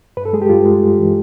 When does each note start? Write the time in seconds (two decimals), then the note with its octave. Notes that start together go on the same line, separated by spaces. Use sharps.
0.17 G2 B4
0.25 A4
0.33 G#3 G#4
0.42 G4
0.50 G2 F4
0.65 G#3
0.82 G2
0.99 E3